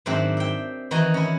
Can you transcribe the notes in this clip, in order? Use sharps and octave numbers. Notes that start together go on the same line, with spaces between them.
G#2 D#3 F#3 C4 D4 E5
E5 G5
D#3 E3 D#4 F#4 A#5
C#4 E4